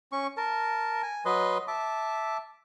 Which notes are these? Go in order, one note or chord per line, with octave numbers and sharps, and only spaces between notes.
C#4 C#6
A#4 A5
G#5
F#3 B4 D#5 C6
E5 A5 D6